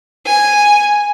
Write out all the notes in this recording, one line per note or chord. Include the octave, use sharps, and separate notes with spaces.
G#5